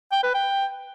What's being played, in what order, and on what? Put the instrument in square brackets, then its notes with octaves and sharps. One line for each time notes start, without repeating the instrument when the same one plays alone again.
[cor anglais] G5
B4
G5